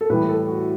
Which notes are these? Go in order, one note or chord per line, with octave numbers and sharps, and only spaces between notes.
A4
A2 E3 G3 B4
A4
F#4